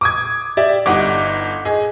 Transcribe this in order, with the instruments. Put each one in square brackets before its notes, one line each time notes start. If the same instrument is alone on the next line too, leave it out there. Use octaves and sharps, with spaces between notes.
[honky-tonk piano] D6 D#6 G#6
[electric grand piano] G4 E5 [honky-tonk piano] D5
[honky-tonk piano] G1 D#4 [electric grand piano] F#5 D6
[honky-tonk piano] G#4 D#5